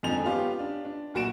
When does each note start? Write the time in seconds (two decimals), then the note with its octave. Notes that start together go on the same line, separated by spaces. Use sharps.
0.03 F2 G#2 D3 F3 G#5 F7
0.24 B3 C#4 F4 G4
0.59 D4
0.85 D4
1.14 D1 A#2 F#4 D7 E7